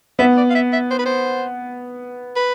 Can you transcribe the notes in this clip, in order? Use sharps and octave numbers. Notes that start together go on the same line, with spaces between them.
B3 E5
D5
F5
E5
E5
C5
B4
C5
B4